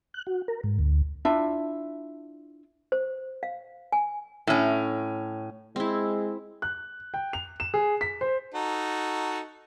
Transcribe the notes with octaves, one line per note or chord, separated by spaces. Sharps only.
F#6
F#4
A#4
G#2
D2
D4 E4 F4 E5
C5
F5
G#5
A2 C#4
G#3 C4 E4
F#6
G5
F7
E7
G#4
B6
C5
D#4 F#4 A4